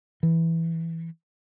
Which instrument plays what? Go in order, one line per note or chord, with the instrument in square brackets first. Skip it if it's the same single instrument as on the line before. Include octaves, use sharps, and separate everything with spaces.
[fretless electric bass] E3